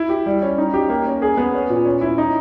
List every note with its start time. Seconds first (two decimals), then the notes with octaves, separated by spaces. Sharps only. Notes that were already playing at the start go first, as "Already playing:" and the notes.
Already playing: E4
0.09 G4
0.26 G3
0.42 C#4
0.58 D#4
0.74 G4
0.89 A#3
1.06 C#4
1.22 G#4
1.37 B3
1.54 C#4
1.70 A#2
1.85 C#4
2.01 E4
2.18 D#4